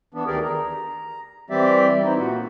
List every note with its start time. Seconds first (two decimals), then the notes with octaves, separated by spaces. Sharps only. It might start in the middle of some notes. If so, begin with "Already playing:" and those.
0.14 E3 B3 D4
0.27 D2 D#3 G4 G#4 A#4 D5
0.44 A#5
1.50 E3 G3 C4 G4 D5 E5
2.03 C4 D#4 E4
2.17 A#2 F#4